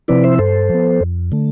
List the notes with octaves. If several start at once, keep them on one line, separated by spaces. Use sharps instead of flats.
C3 F3 C4 E4 B4 D5
C5 E5
G2 A4 C5
F3 B3
F2
D3 A3